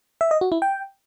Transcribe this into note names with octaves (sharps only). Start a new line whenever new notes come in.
E5
D#5
F#4
E4
G5